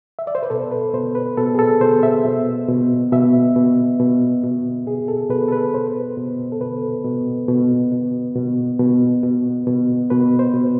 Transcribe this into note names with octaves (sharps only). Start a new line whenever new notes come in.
E5
D5
C5
B4
B2 A4
B4
B2 C5
B4
B2 A4
G#4
A4
B2 C5
E5
B2
B2
B2 E5
B2
B2
B2
B2 G#4
A4
B2 B4
A4
B4
B2 C5
B2
A4
B2 B4
B2
B2
B2
B2
B2
B2
B2
B2 B4
C5
B2